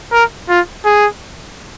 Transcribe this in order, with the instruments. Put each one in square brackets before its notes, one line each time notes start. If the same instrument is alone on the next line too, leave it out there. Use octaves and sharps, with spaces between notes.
[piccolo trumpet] A#4
F4
G#4